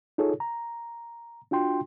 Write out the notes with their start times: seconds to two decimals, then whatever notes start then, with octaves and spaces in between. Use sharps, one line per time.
0.18 D#4 F4 G#4 A4 C#5
0.40 A#5
1.51 D4 F4 F#4 G5 C6